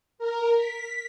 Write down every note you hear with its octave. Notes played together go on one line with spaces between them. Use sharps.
A#4
B6